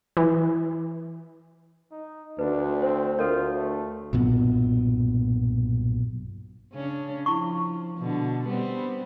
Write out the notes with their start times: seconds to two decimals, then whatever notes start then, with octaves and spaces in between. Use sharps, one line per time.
0.17 E3
1.91 D#4
2.39 D2 D4 B4
2.82 C4 C5
3.19 D2 F4 A4 A#4 C#5
3.57 A3
4.13 B1 G2 A#2 B3
6.73 C#3 C#4 D4
7.26 F3 E4 C#6
7.99 B2 D3
8.47 G3 B3 C4